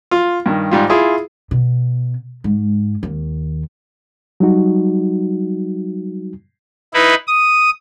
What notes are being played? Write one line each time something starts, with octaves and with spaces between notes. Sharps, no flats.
F4
G2 D#3
G#2 G3 F4
E4 F4 G#4
B2
G#2
D#2
F#3 G3 D#4 F#4
D#4 E4 B4
D#6